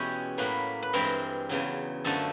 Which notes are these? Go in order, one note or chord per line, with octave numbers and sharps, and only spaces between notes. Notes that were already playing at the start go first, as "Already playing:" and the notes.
Already playing: E2 B2 G#3 C#4 E4 G4
A2 F#3 A#3 B4
B4
G2 E3 G#3 C4 A#4
E2 C#3 F#3
F#2 D3 F3 A3 A4